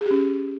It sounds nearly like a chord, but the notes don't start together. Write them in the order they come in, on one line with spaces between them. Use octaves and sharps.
G#4 G4 C#4